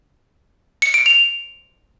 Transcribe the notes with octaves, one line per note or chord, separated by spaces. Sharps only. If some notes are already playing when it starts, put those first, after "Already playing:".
C#7
D7
F7